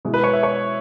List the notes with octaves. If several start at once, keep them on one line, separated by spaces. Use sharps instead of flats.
B2 G#3 E4
B4
C#5
E5
C#5